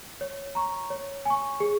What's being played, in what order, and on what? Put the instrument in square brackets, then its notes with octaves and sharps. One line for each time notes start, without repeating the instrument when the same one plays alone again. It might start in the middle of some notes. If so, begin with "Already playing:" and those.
[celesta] C#5
A#5 C#6
C#5
G#5 C#6
G#4